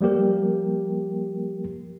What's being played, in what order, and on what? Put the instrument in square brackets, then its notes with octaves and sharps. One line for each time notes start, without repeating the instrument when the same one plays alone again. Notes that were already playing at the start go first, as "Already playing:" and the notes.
[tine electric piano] F3 G3 A#3 G4 A#4